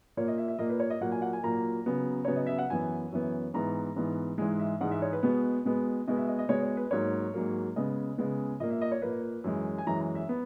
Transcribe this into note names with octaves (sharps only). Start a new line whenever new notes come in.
A#2 A#3 C#5
D#5
E5
E5
A#2 A#3 D#5
B4
C#5
D#5
A#2 F#3 A#3 F#5
G#5
F#5
G#5
A#2 F#3 A#3 A#5
C#3 F#3 B3
C#3 F#3 B3 C#5
D#5
E5
F#5
F#2 E3 B3 G#5
F#2 E3 B3
G#2 E3 B3 A#5
G#2 E3 B3
G#2 E3 G#3 G#5
E5
G#2 E3 G#3 F#5
E5
C#5
B4
B2 G#3 B3
B2 G#3 B3
B2 G#3 B3 D#5
E5
D#5
D#5
B2 G#3 B3 C#5
C#5
B4
G#2 F#3 A#3 C#5
G#2 F#3 A#3
C#3 G#3 B3 D#5
C#3 G#3 B3
A#2 A#3 D#5
E5
D#5
C#5
A#2 A#3 B4
F#2 E3 G#3
G#5
F#2 E3 G#3 A#5
A#5
E5
B3